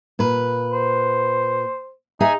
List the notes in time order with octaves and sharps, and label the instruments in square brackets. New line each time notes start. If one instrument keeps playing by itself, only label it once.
[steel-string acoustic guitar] A#2 B4
[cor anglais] C5
[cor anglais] D#4 [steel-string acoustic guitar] G#4 E5 G#5